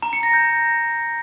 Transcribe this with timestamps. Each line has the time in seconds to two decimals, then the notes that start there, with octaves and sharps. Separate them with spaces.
0.02 A#5
0.13 C#7
0.23 A#6
0.33 G6